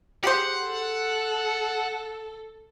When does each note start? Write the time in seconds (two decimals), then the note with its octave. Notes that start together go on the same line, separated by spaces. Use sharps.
0.24 G4 G#4 C5 F#5
0.64 A4